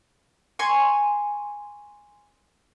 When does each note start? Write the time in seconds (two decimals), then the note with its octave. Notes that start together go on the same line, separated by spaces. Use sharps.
0.59 G#5 C6 C#6